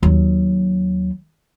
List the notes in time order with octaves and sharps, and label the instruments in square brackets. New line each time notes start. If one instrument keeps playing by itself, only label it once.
[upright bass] D#2 F#3